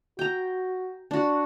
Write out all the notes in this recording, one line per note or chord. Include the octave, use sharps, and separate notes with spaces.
F#4 G5 A#5
D4 F#4